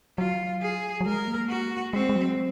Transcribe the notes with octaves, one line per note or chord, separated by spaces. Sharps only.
F#3 F4
G#4
F#3
G#3 A#4
A#3
F#4
G#3 C4
G#3
F#3